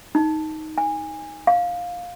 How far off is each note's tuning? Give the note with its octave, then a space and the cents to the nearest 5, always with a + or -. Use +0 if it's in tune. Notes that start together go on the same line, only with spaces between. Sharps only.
D#4 +10
G#5 -20
F5 +15